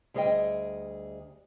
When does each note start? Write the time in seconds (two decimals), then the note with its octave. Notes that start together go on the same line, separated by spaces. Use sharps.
0.14 D2 G3 G#4 D5 D#5 G5